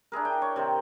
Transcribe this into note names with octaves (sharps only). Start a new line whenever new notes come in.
D4 E4 G#4 A#4
G5
C#5
C3 D#3 C5